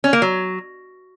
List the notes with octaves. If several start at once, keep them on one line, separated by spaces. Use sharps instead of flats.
C#4
A#3
F#3